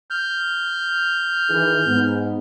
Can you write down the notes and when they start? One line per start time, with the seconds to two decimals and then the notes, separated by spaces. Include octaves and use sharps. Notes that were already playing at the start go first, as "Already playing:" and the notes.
0.10 F6 G6
1.49 D#3 E3 G#4
1.87 G#2 B3